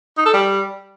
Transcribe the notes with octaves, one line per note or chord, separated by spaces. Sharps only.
D#4
A4
G3